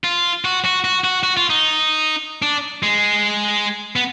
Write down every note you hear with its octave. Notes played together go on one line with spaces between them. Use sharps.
F4
F#4
F#4
F#4
F#4
F#4
F4
D#4
D4
G#3
B3